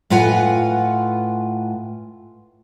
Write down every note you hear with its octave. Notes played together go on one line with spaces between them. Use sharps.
A2 F4 B4 F#5 G#5